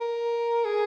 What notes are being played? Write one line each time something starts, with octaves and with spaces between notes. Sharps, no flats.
A#4
G#4